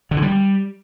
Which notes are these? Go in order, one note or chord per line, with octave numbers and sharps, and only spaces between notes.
D3
E3
G3